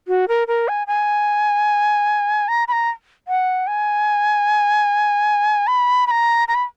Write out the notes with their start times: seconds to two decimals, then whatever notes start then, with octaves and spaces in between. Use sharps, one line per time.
0.08 F#4
0.28 A#4
0.47 A#4
0.68 G#5
0.87 G#5
2.48 A#5
2.68 B5
2.72 A#5
3.28 F#5
3.67 G#5
5.67 B5
6.07 B5
6.11 A#5
6.48 A#5
6.55 B5